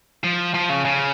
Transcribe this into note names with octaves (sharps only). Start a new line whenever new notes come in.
F3
F3
C#3
C#3